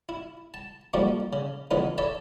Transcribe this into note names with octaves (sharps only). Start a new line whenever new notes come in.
E4
A5
F3 G3 A3 A#3 D#4 F#4
C#3
F2 C#3 E3 B3 D#4
A4 C#5 D5 E5 B5